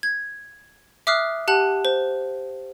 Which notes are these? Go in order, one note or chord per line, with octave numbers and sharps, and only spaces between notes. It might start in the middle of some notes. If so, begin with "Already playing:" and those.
G#6
E5 D6 D#6 F6 F#6 C7
G4 F#5 A5 F#6 F#7
C5